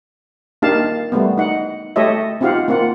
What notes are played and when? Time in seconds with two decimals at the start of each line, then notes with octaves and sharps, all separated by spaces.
0.62 A#3 D4 D#4 G4 F5 A5
1.12 G3 A3 B3
1.38 D#4 F#5
1.96 A3 G4 A4 C#5 D#5 E5
2.41 C4 D#4 F4 G4 F5 F#5
2.68 A#3 C4 F4 F#5